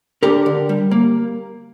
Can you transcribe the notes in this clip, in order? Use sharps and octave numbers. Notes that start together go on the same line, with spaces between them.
D3 G4 A#4
D3
G3
A#3